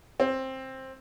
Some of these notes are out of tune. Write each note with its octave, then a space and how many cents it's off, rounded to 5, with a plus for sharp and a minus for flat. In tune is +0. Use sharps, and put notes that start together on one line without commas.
C4 +15